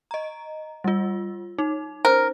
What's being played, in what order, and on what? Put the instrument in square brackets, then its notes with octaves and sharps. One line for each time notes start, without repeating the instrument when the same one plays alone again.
[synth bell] D#5 A#5
G3 F4
D#4
[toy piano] C#4 C5 [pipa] A#4